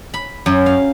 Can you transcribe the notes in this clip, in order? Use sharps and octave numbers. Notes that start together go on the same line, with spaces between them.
B5
F#2
F5